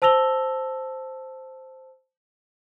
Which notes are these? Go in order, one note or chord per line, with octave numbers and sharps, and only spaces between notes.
C5 A5 E6 A#6 F7 G7